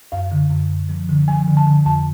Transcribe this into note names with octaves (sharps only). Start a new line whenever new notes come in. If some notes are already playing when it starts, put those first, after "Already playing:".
F#2 F5
D3
F#2
F#2
F3
D3
F3 G#5
D3
A5
D3
F2 A5